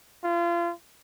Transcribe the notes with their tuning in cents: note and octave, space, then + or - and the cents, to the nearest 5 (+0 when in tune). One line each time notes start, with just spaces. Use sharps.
F4 -30